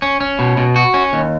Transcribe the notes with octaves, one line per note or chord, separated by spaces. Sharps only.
C#4
C#4
B2
B2
F#4
C#4
D#2